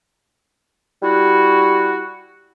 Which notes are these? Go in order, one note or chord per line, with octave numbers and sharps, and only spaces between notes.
G3 E4 F#4